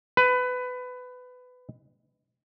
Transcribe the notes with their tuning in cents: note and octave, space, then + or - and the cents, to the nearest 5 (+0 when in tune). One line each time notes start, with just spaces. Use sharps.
B4 +20